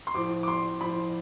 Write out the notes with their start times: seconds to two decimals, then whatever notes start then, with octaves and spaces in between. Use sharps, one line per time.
0.07 C6
0.14 A2 F3 D6
0.43 D6
0.48 C6
0.81 A2 F3 B5